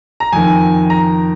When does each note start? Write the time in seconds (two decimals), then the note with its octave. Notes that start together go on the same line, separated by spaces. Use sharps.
0.20 A#5
0.33 F2 D#3 G#5
0.90 A#5